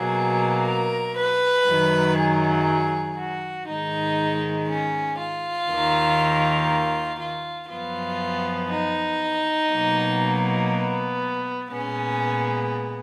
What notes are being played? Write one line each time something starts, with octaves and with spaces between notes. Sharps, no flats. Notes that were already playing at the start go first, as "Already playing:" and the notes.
Already playing: B2 F#3 A#3 G#4
A#4
B4
F#2 D#3 F#3
G#4
F#4
G#2 D#3 G#3 D#4
C#4
F4
D#2 D#3 A#3
F4
F#2 F3 B3 F4
D#4
B2 F#3 A#3
B3
A#2 G#3 B3 C#4